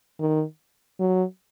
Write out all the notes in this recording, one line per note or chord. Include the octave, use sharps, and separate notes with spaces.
D#3
F#3